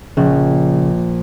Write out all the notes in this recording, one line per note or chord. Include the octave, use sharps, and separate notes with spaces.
A#1 C#3